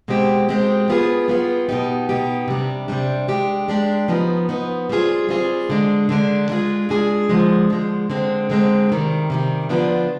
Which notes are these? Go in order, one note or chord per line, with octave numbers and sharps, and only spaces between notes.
B2 G#3 C4 G4
B2 G#3 C4 G4
G3 B3 F4 G#4
G3 B3 F4 G#4
B2 B3 D#4 G4
B2 B3 D#4 G4
C3 G3 D4
C3 G3 D4
G#3 D4 G4
G#3 D4 G4
F3 B3 D#4
F3 B3 D#4
G3 C4 F4 G#4
G3 C4 F4 G#4
D3 G#3 D4
D3 G#3 D4
G#3 D4 F4 G#4
G#3 D4 F4 G#4
D3 F3 G#3
D3 F3 G#3
D3 G#3 C4
D3 G#3 C4
C3 D#3 G3
C3 D#3 G3
D3 F3 B3 D4 F4